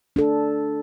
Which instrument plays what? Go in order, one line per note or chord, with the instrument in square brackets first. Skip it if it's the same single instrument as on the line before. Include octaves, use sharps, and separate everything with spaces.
[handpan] D4 A4